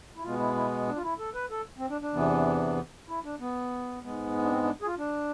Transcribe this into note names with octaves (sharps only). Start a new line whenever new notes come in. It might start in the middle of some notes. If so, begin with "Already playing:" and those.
E4
B2 G#3 B3 F4
E4
E4
D4
F4
E4
A4
B4
A4
C4
D4
D4
E2 C3 E3 B3
E4
D4
B3
G#2 G#3 B3
D4
C4
D4
G#4
F4
D4